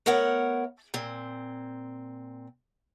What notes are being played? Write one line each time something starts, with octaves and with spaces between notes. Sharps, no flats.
A3 B3 A#4 C#5 F#5
A#2 C4